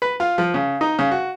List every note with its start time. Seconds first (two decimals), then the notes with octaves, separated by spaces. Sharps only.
0.02 B4
0.20 F4
0.38 F3
0.54 C#3
0.81 D#4
0.99 C#3
1.11 F#4